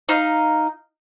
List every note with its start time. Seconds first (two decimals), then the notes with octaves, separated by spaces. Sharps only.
0.09 D#4 F5